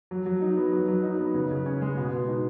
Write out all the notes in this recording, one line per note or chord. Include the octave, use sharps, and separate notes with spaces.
F#3
F#3
D#4
B3
F#3
F#3
D#4
B3
C#3
C#3
C#4
G#3
B2
B2
D#4